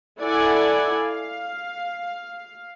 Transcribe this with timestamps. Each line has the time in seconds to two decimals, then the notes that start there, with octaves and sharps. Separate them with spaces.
0.20 E4 A4 D5 F#5 G#5
1.02 F5